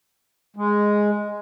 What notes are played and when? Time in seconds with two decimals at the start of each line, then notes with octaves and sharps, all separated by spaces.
0.56 G#3